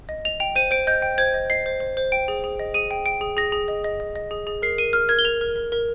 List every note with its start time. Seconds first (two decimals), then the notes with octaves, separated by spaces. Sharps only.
0.09 D#5
0.25 D#5 F7
0.40 G5 F7
0.56 C5 D#7
0.71 C5 D7
0.87 D#5 G6
1.02 G5
1.18 C5 G#6
1.34 D#5
1.50 D#5 C7
1.66 C5
1.81 C5
1.97 C5
2.12 G5 D7
2.28 G#4
2.44 G#4
2.59 D#5
2.74 G#4 D#7
2.91 G5
3.06 G5 D7
3.21 G#4
3.37 G#4 A#6
3.52 G#4
3.68 D#5
3.84 D#5
4.00 D#5
4.16 D#5
4.31 G#4
4.47 G#4
4.62 A#4 C7
4.78 A#4 D#7
4.93 A#4 F6
5.09 A#4 G#6
5.19 G7
5.25 A#4 F7
5.41 A#4
5.56 A#4
5.72 A#4